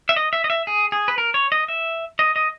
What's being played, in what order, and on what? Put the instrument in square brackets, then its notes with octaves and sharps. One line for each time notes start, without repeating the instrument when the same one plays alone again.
[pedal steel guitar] E5
D#5
E5
D#5
E5
G#4
G#4
B4
A#4
C#5
D#5
E5
D#5
D#5